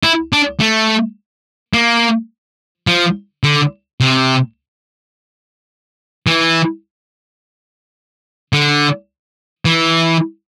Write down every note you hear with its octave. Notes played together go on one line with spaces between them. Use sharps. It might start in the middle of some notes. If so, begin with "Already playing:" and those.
E4
D4
A3
A#3
F3
D3
C3
E3
D3
E3